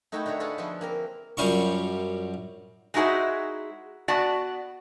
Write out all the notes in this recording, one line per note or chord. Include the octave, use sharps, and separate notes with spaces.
A3 D#4 E4 F#4 E5 G5
D3 F#4 C#5 A#5 B5
F4 F#4 G#4 A4 B4 F#5
F3 B3 F#4 E5 C6
A#3 C4 A#4
F#2 G3 F4 C#6
G#3 D#4 E4 F#4 G#4 C5
B3 F#4 D5 A5